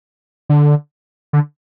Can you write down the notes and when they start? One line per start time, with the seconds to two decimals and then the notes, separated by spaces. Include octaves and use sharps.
0.49 D3
1.33 D3